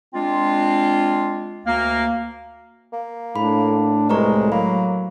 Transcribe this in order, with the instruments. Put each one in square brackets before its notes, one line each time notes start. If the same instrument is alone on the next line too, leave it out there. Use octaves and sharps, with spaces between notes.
[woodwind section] G#3 C4 D4 F4
D2 A#3 F5
[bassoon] A#3
[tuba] A2 [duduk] D4 [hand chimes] B5
[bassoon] C2 [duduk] G#3 [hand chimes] B4 A#5 C#6
[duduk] F#3 [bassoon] A#3 [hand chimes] B5